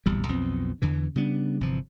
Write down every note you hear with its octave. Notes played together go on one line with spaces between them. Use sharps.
D1 A#1 E2 G3
B1 F2 B3 C4
E2 D3 E3
C#3 G3 B3 D4
G1 C3 E3 F3